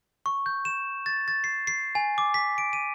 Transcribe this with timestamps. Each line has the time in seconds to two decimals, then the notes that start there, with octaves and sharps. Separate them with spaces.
0.26 C#6
0.46 G6
0.65 E7
1.06 A6
1.28 A6
1.44 C7
1.67 C7
1.95 G#5
2.18 D6
2.34 B6
2.58 D7
2.73 D#7